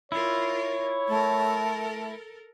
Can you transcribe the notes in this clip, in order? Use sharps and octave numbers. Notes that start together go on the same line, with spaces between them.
E4 F4 A#4 C#5
A3 A4 A#4